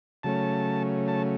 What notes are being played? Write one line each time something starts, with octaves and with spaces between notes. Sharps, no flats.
C#3 F#3 A3 C#4 A5
A5